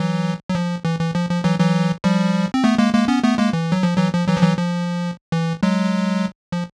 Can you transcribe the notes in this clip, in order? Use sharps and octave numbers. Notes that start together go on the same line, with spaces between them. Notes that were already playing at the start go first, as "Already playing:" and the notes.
Already playing: E3 F#3
F#3
F3
E3
E3
F3
F3
E3 F#3
E3 F#3
F3 G3
C4
A3 B3
G#3 A#3
G#3 A#3
B3 C#4
A3 B3
G#3 A#3
E3
F#3
F3
E3 F#3
F3
E3 F#3
F3
E3 F#3
F3
E3
F#3 G#3
F3